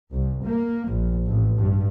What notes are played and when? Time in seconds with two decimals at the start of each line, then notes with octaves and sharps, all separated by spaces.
0.11 C2
0.44 A#3
0.89 A#1
1.27 A1
1.58 G2